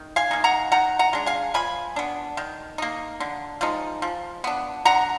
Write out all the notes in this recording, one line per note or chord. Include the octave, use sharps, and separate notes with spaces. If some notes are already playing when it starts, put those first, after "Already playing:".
Already playing: D#3
F5 G#5
A#3 D#4
F#5 A#5
D#3 F#5 A#5
F#5 A#5
G#3 D4
F5 G#5
F3 G#5 B5
B3 D4
D#3
A#3 D#4
D3
F3 G#3 D#4
F3
B3 D4
D3 F#5 A#5